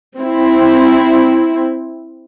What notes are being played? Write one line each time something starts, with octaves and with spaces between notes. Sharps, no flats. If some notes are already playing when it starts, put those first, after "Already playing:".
C4 E4